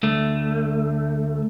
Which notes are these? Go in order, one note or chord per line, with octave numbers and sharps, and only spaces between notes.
D2 A3